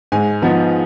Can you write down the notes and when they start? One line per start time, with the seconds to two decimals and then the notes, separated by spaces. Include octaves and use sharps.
0.12 G#2 G#5
0.42 F3 B3 D#4